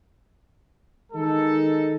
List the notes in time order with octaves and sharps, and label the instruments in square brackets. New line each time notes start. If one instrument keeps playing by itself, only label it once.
[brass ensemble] D#3 G#3 D#4 A4